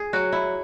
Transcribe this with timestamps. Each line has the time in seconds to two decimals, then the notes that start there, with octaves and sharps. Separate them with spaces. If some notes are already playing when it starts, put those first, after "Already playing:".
Already playing: G#4
0.13 F#3 F#4
0.32 E4